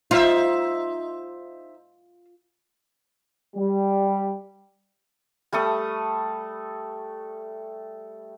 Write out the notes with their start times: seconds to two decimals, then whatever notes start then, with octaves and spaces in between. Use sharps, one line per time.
0.11 D#4 F4 C5 E5
3.56 G3
5.53 G3 A3 A4 D#6